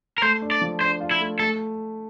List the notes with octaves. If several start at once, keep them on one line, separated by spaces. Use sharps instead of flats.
A#4
A3 C5
D4
D5
F3
D4 C5
F4
E4
A3
A3 A4